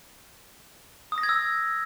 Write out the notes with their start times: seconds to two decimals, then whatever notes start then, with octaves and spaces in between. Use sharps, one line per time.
1.12 D#6
1.18 A#6
1.23 G#6
1.29 E6